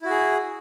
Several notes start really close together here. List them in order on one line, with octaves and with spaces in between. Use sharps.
E4 F#4 G#4